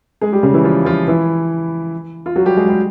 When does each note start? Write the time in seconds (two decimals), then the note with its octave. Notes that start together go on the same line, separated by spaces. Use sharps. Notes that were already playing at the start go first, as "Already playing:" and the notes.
0.21 G#3 G#4
0.32 G3 G4
0.43 C#3 C#4
0.54 E3 E4
0.64 F3 F4
0.85 F3 F4
1.07 E3 E4
2.26 F4
2.36 F#3 F#4
2.46 G3 G4
2.57 G#3 G#4
2.68 G3 G4